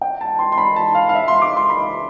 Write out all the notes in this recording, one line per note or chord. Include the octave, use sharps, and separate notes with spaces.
G5
A5
C6
C6
B5
A5
F5
F5
E5
C6
D6
C6
B5